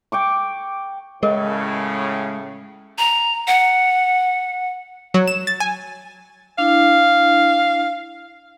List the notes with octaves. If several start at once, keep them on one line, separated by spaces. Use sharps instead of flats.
G5 C#6 D6
A2 C#3 G#3 G#4 A#4 D#5
A#5
F#5
F#3
E7
A6
G#5
D4 E4 F5